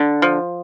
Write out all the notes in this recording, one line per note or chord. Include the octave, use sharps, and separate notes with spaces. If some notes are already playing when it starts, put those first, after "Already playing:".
Already playing: D3
F3